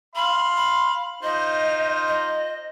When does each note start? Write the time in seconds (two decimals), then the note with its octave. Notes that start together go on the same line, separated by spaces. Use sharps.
0.16 F5 B5 C6
0.57 B5
1.23 D#4 F4 C5 D#5
2.08 D#5